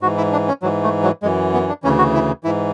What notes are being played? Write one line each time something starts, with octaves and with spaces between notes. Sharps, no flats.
G#2 E3 F#4
E4
D4
C#4
G#2 E3 F#3
A3
F#3
F#2 E3 G#3
B3
D4
D2 C#3 E3 C#4
F#4
E4
G#2 E3 E4